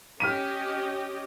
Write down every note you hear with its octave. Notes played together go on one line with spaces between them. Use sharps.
C#4 G4 D#5 F6 B6 D#7